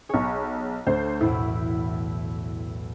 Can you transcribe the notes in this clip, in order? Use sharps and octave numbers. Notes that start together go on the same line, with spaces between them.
B1 G#4 C#5
D2 C5
B1 E2 A2 E4